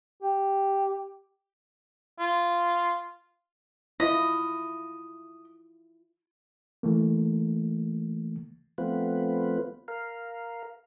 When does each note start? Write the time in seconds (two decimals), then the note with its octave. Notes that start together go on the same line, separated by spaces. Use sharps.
0.23 G4
2.20 F4
4.00 E4 F4 D#5
6.83 E3 A3 A#3
8.78 F3 A3 B3 C4 F4 B4
9.88 A#4 F5